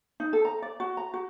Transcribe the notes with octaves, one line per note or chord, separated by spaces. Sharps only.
D#4
A4
A#5
D5
F#4
A#5
F#4